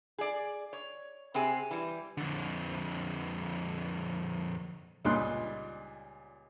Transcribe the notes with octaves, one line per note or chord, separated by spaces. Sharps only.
G#4 D5
C#5
C3 C4 G4 G#4 G#5
E3 G3
F2 D3
C#2 A#2 G3 D#4 C6 F#6